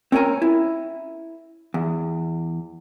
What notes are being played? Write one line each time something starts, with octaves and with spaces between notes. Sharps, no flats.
C4 C#4 A#4 C#5 G#5 A#5
E4
E2